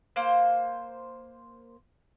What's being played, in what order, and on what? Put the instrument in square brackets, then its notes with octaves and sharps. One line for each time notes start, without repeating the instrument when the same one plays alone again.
[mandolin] A#3 C5